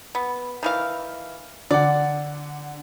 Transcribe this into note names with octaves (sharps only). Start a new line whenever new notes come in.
B3
D#3 E3 F5
D3 D5 F#5